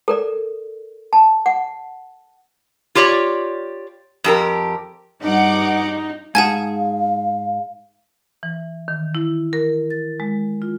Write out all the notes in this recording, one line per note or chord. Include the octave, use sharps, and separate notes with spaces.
A4 A#4 D5
A5
F#5
F4 G4 C#5 D5
F2 G4 A#4
G2 D#4 F#5 D6
G#2 G#4 F5 F#5 G#5 A5 G#6
E3
D#3
E4
A#4
A6
G#3
F4